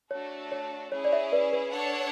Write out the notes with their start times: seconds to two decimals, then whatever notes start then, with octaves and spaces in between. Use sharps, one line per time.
0.11 A3 D4 F#4 A4 C#5
0.52 C#5
0.91 C#4 E4 G#4 C#5
1.05 D5
1.12 C#5 E5
1.32 B4 D5
1.53 B4
1.73 D4 A4 C#5 F#5